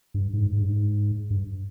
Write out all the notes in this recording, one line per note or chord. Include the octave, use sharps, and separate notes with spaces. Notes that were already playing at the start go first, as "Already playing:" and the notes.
G2
G#2
G#2
G2
G#2
G2